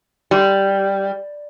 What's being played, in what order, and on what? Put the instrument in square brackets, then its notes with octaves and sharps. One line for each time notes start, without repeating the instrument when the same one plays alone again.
[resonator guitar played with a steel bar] G3